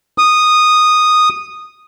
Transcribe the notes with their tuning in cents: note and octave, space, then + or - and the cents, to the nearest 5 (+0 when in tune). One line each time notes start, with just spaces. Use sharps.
D#6 -10